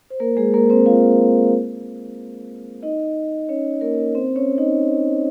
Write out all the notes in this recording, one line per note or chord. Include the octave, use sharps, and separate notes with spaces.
C5
A#3 A#4
G#3 G#4
A#3 A#4
C4 C5
F4 F5
D#4 D#5
C#4 C#5
A#3 A#4
C4 C5
C#4 C#5
D#4 D#5